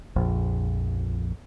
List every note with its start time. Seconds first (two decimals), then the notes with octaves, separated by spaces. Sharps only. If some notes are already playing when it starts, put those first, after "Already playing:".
0.16 A#1 F2